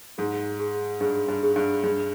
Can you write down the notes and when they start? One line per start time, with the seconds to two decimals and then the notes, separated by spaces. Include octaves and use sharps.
0.18 G#2 G#4
0.59 G#4
1.01 G2 G#4
1.28 G2
1.43 G#4
1.56 G2
1.84 G2 G#4